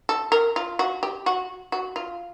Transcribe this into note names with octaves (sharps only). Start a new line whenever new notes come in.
A4
A#4
F4
F#4
G4
F#4
F#4
F4